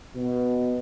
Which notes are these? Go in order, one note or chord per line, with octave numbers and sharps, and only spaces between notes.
B2